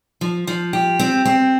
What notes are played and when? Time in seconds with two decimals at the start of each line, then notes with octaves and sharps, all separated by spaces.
0.21 F3
0.47 F3
0.73 G4
0.99 C4
1.26 C4